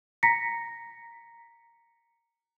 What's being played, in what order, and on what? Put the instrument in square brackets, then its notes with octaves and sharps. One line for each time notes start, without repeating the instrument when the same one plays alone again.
[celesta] A#5 A#6 B6 C#7